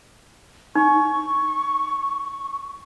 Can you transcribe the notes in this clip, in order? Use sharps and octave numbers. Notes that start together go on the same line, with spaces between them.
D#4 C#6